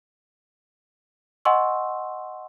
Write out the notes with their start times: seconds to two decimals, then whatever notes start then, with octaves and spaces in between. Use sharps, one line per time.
1.45 D#5 F#5 G#5 C6 C#6 E6